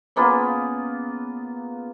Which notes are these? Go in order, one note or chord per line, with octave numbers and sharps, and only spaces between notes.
C#3 A#3 B3 F4